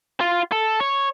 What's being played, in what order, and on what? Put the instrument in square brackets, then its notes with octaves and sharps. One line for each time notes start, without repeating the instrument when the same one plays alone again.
[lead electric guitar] F4
A4
C#5